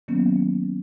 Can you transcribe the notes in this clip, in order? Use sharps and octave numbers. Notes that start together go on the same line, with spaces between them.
D#3 F#3 A#3 B3 C#4